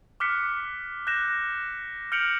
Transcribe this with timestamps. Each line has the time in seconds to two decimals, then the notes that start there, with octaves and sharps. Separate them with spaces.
0.20 D6 F6 F#6 B6 C#7
1.07 F#6 G6 A#6 E7
2.12 F6 G6 C#7 D7 F7 F#7